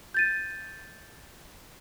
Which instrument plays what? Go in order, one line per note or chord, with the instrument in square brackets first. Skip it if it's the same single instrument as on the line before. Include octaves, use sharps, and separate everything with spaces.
[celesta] G6 A6 D#7